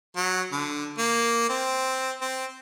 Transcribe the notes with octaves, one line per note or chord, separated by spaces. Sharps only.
F#3
D3
A#3
C4
C4